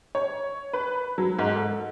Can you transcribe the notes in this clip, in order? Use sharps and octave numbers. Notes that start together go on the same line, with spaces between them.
C#5
B4
F#3
G#2
A4